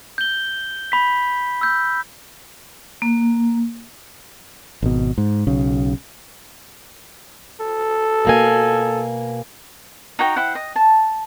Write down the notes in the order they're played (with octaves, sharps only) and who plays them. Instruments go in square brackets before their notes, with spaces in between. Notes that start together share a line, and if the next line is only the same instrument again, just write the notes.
[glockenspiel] G6 G7
B5 B6
E6 G6
[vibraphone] A#3
[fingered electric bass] G#1 B2
G#2
B1 C#3
[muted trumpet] A4
[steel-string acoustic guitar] B2 A#3 G#5
[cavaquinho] D#4 F#4 G5 A#5
E4 C5 F#5
D#5
A5